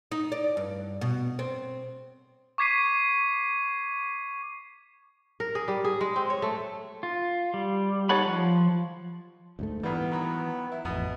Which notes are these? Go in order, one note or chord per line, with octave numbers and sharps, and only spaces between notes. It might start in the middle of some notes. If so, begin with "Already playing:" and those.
D#4
D5
G2
B2
C4
C#6 D6 G#6 B6 C7 D#7
A#4
G#4
G3
G#4
G#3
C4
C#5
A3
F4
G3
D#4 A4 C#5 F#5 B5
F3
D2 G#2 A3
A#2 E3 G3 B3
D#3 F#3
E4
A1 F2 B2 B3